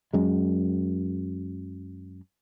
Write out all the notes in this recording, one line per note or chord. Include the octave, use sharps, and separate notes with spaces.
F#2 G#3